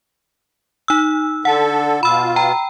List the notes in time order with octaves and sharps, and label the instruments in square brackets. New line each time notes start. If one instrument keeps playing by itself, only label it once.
[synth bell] D#4 E6
[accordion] D3 A4 [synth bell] F#5
[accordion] B2 F4 [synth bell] B5 E6
[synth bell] G5 A#5